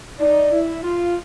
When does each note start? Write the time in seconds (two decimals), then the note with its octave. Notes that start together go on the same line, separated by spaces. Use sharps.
0.19 D#4 D5
0.50 E4
0.82 F4